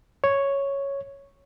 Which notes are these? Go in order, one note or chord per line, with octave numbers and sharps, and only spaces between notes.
C#5